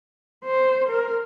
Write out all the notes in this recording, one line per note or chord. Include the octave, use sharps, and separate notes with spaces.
C5
A#4